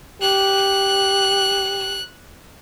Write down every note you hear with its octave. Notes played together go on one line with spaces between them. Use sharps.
G4 F#6